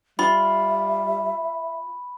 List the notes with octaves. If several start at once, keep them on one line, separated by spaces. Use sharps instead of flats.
G3 F4 E5 B5